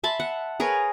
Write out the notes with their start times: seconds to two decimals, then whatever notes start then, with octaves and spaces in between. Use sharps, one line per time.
0.04 E5 A5 B5 C6
0.20 F#5
0.60 G#4 A#4 B4 C#5